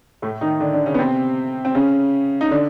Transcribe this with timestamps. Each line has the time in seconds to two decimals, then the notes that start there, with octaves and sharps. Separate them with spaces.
0.22 A2 A3
0.41 D#3 D#4
0.60 D3 D4
0.73 D3 D4
0.86 C#3 C#4
0.94 B3
0.99 C3 C4
1.65 C4
1.75 C#3 C#4
2.41 D#4
2.51 D3 D4